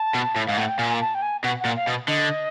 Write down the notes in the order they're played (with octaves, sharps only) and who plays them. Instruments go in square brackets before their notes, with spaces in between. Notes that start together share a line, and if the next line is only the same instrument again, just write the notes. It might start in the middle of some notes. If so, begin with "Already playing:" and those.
Already playing: [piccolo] A5
[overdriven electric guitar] B2
A2
[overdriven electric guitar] G#2 [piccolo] F5
[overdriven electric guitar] A2 [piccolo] F#5
[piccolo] G5
[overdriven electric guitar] A#2 [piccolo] G#5
[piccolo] A5
G5
G#5
[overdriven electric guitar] B2 [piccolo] F#5
[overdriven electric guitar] A#2 [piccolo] F#5
[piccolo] F5
[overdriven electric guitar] B2
[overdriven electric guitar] D3 [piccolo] D#5